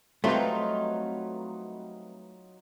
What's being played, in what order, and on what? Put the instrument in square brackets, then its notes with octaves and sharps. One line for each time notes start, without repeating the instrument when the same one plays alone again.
[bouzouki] F#3 D#4 F4 [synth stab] G3 C4 B4 [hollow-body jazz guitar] A3